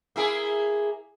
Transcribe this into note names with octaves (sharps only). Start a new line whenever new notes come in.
A#3 E4 G#4